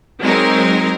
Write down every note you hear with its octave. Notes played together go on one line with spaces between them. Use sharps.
F#3 G#3 C4 D#4 A#4